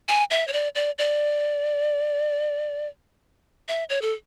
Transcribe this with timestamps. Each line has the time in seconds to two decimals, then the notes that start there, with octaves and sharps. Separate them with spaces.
0.08 G#5
0.31 E5
0.48 C#5
0.53 D5
0.75 D5
0.98 D5
3.68 E5
3.90 C#5
4.02 A4